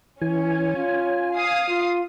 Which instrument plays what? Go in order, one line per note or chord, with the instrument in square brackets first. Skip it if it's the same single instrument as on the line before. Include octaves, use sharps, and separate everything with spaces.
[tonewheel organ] E3 G#5 [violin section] C#4
[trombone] F4 [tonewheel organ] G#5
[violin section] F5 D#6 C7
[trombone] F4